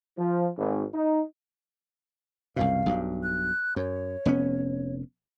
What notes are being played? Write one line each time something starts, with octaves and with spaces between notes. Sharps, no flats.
F3
G#1
D#4
C2 F#2 B2 F5
B1 G2
F#6
F#2 C#5
F1 B3 C#4